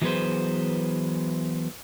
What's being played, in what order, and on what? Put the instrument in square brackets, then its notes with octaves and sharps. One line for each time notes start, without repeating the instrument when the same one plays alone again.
[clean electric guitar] E3 F#3 B3 G#4 B4 C5